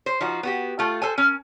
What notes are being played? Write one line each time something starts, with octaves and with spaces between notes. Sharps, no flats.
C5
F3 D#4 F#4
B3 F#4 G4
A3 F4
A4 C5 G#5
C#4 A#4